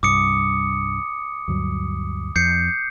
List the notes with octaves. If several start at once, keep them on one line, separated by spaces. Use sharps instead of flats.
C2 G2 D6 D#6 C#7
D2 G2 F#3
F2 G6 C7 C#7